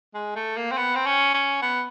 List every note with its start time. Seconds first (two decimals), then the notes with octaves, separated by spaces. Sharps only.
0.14 G#3
0.36 A3
0.57 A#3
0.71 C4
0.77 B3
0.95 C4
1.06 C#4
1.34 C#4
1.62 B3